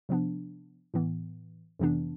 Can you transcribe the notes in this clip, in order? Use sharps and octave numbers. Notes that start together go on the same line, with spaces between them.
C3 F3 B3 D4
A2 E3 B3
F2 C3 E3 B3 D4